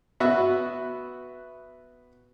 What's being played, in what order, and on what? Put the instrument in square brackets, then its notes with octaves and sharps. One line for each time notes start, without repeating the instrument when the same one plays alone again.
[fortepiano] B3 F#4 E5